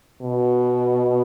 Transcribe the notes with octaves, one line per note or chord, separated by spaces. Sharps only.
B2